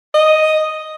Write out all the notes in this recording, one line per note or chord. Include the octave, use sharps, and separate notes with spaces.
D#5